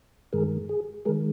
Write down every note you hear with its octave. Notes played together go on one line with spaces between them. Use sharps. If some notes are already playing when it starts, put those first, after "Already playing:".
G2 D#3 G#3 G#4 A#4
G#4
D#3 G#3 G#4 A#4